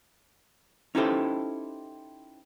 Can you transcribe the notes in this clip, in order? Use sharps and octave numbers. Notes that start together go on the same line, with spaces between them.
C#4 D#4 E4 G4 A4 C5